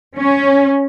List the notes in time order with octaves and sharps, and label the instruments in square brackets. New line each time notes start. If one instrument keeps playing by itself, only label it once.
[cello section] C#4